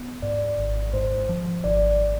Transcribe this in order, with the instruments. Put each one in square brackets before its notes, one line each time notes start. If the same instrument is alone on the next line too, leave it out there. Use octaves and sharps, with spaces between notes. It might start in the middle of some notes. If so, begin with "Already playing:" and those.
Already playing: [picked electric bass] B3
[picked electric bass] G#2 [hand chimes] D5
[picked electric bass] G#1
[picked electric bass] G#2 [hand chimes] C5
[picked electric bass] F3
[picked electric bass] G#1 [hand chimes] D5